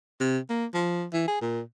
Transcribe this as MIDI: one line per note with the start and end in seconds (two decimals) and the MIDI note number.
0.20 0.38 48
0.50 0.66 58
0.74 1.05 53
1.13 1.27 52
1.27 1.38 68
1.41 1.60 46